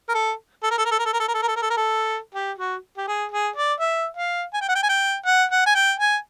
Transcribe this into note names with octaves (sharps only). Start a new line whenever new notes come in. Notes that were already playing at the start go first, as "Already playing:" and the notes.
A#4
A4
A4
A#4
A4
A#4
A4
A#4
A4
A#4
A4
A#4
A4
A#4
A4
A#4
A4
A#4
A4
G4
F#4
G4
G#4
G#4
D5
E5
F5
G#5
G5
F#5
G5
G#5
G5
F#5
F#5
G#5
G5
G#5